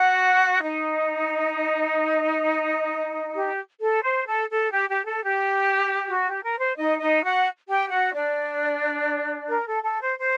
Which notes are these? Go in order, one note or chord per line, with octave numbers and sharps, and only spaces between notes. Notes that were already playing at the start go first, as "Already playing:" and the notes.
Already playing: F#4 F#5
D#4 D#5
G4
A4
C5
A4
A4
G4
G4
A4
G4
F#4
G4
A#4
C5
D#4 D#5
D#4 D#5
F#4 F#5
G4 G5
F#4 F#5
D4 D5
A#4
A4
A4
C5
C5